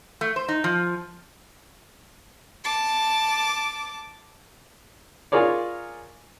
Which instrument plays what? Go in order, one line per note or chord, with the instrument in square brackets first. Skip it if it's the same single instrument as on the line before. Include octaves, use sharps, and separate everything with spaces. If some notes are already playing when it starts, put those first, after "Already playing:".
[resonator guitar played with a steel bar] A3
C5
D#4
F3
[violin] A5 D6
[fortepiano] F4 G#4 A#4 C#5 D5